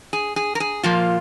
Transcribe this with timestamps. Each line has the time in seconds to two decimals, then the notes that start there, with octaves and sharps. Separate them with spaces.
0.13 G#4
0.36 G#4
0.55 A#4
0.60 G#4
0.83 A#2 F3 A#3 F4